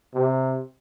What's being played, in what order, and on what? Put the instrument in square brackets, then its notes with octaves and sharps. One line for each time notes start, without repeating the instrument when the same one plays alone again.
[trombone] C3